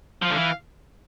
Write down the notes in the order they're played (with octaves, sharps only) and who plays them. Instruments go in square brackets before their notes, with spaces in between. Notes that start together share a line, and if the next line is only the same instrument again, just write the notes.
[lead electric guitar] F3 [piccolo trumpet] F5
[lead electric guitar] D3
E3